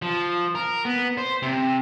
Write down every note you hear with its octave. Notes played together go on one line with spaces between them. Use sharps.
F3
A#4
B3
C5
C3